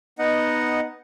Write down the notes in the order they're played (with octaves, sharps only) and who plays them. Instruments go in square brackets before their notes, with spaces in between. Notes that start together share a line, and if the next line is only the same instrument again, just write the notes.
[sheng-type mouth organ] B3 D#4 D#5 F#5